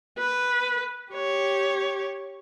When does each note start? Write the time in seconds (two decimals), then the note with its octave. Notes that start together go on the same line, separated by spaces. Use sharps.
0.18 B4
1.13 G4 C#5